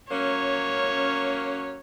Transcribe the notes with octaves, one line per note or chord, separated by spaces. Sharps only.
F#3 A#3 C#4 C#5